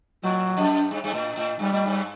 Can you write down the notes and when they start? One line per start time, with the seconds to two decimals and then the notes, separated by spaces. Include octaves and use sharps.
0.23 A2 F#3
0.57 F#2
0.91 G2
1.04 G2
1.14 A2
1.37 A2
1.59 G2 G3
1.72 A2
1.86 G2